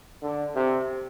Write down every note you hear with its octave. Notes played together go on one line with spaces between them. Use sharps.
D3
C3